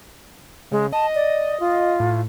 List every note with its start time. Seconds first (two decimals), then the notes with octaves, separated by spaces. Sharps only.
0.72 C#3 G#3
0.93 D#5 A5
1.15 D5
1.60 F4
2.00 A2